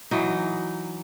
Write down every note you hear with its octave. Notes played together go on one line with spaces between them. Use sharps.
E3 F#3 D#4